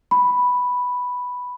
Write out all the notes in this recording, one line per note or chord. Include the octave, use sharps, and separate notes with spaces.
B5